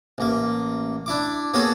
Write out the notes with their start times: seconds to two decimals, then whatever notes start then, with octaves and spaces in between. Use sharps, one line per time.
0.18 A1 A#3
1.06 D4 E4 D6
1.54 A#3 B3 F#4 G#4 A4 C#5